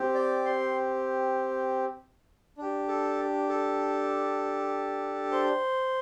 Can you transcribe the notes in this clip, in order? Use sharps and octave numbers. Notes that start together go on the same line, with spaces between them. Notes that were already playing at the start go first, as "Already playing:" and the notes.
Already playing: C4 G4
D5
C6
D4 G4
A4
A4
C5